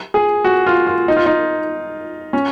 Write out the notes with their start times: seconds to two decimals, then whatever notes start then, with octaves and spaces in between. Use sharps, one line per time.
0.14 G#4
0.44 F#4
0.66 F4
0.87 F4
1.08 D#4
1.16 F4
1.26 D#4
2.33 C#4